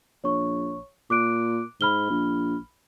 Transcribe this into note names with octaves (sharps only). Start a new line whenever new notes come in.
A#1 C#5 C#6
A#2 D6 F#6 D7
G#2 B5 F6 G7
A#1